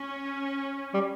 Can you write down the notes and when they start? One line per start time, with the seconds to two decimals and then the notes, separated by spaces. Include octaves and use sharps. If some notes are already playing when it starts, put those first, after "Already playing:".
Already playing: C#4
0.94 G3